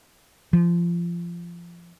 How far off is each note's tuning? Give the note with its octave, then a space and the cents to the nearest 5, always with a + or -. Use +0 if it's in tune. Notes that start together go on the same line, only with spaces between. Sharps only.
F3 -20